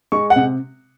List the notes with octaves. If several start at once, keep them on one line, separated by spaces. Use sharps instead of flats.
G#3 C#6
F#5
C3